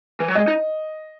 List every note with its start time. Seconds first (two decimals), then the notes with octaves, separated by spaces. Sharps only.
0.20 E3
0.28 F#3
0.35 G#3 D#5
0.48 D#4